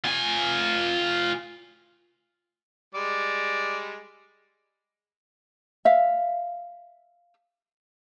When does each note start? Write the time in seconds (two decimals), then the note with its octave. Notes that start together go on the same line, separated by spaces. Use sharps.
0.04 F4 G#5
2.95 G3 G#3 D5
5.85 E5 F5